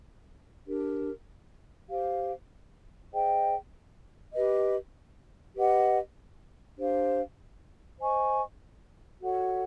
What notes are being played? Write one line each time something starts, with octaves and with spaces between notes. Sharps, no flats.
D4 G4 A#4
G4 C5 F5
G#4 C5 D#5 G5
G4 B4 D#5
G4 B4 D#5 F#5
D4 G4 C5 F5
C5 D#5 G#5 C#6
F#4 A4 C#5 F#5